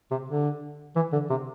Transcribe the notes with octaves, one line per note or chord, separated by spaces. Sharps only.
C3
D3
E3
D3
C3